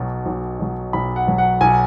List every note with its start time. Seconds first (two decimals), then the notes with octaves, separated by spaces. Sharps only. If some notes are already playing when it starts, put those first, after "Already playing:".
Already playing: B1 B2 F#3
0.26 B1
0.59 B2 F#3
0.93 B1 B5
1.16 F#5
1.27 B2 F#3
1.38 F#5
1.61 B1 G#5